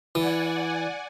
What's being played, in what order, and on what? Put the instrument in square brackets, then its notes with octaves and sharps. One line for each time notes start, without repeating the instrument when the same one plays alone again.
[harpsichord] E3 [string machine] D5 F#5 G#5